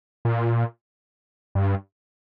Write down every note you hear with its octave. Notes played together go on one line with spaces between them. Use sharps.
A#2
G2